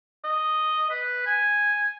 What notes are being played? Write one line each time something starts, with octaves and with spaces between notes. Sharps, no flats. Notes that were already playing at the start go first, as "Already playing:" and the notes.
D#5
B4
G#5